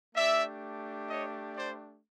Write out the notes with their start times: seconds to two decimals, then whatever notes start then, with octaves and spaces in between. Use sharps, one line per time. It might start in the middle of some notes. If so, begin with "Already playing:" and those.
0.15 A3 D4 G4 D5 E5
1.09 C#5 D#5
1.56 C5 D5